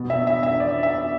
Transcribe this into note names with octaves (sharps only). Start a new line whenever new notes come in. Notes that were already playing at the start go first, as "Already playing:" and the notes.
Already playing: B2
E5
E5
E5
D5
E5